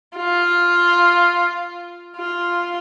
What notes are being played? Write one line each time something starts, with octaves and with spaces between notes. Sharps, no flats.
F4
F4